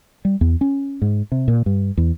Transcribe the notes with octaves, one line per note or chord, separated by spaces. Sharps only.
G3
E2
C#4
G#2
C3
A#2
G2
E2